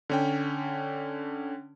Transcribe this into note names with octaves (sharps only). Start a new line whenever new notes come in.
D3 C#4 G5